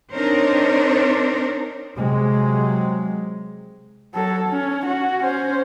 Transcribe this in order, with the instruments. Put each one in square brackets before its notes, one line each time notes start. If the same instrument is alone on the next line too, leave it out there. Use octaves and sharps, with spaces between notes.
[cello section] C4 D4 D#4 A#4 C5 C#5
[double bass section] C3 F#3 G#3
[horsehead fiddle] F#3 A4
C#4
F#4
C#4 C5